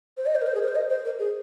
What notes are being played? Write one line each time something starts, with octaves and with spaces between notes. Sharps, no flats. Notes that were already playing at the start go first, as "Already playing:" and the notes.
C5
D#5
C5
A#4
C5
G#4
A#4
C5
D#5
C5
A#4
G#4